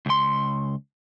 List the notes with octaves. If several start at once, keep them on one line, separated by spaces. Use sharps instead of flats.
C#2 C6